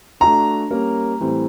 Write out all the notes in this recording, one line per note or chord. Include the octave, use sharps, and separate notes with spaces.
A3 D4 F#4 A#5
G3 A#3 C#4
A2 E3 G3 C4